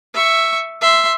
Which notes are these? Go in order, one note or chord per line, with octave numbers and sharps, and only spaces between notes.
E5 C#6
E5 C6